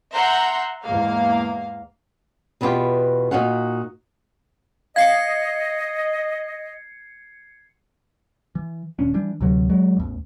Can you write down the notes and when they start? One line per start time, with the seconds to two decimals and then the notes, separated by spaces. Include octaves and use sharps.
0.13 E5 F#5 A#5 C6 G6
0.83 E2 G#2 A#3 F5
2.61 E2 B2 B3 D4 F4 G4
3.31 A#2 F#3 D#4 F#4 F5 F#5
4.96 D#5 F5 G#6 C7 C#7
8.55 E3
8.99 D#1 C#4 D4
9.14 E3 G3 D4
9.41 D2 C3 F#3
9.70 F#3 G#3
9.97 A1 E2